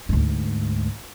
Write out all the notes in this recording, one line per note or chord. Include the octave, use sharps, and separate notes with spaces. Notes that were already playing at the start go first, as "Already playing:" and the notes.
D2 G#2